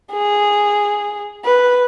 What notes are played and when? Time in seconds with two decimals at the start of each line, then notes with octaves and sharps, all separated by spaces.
0.12 G#4
1.45 B4